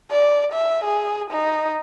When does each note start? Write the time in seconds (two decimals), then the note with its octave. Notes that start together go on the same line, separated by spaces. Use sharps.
0.11 D5
0.52 E5
0.84 G#4
1.30 D#4